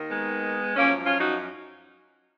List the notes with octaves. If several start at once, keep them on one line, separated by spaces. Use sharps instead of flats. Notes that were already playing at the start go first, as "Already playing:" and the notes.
Already playing: D#2 D#3
G#3 B3
F#2 F3 A#3 C#4
C#4 F4
D#4 F#4